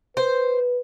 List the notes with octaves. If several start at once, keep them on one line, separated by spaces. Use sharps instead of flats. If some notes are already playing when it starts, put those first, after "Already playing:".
B4 C5